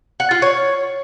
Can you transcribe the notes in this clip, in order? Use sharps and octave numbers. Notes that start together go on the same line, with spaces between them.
F#5
F4
C#5